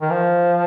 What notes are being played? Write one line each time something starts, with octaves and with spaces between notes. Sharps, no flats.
D#3
F3